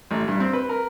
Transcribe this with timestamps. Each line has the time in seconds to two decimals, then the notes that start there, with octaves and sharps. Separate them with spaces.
0.11 A1
0.28 G2
0.40 C4
0.53 B4
0.69 A#4